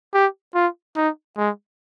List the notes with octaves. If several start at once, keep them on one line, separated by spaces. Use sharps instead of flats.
G4
F4
D#4
G#3